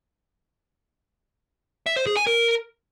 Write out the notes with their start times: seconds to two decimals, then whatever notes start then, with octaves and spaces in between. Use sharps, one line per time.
1.86 E5
1.96 C5
2.06 G#4
2.17 G#5
2.27 A#4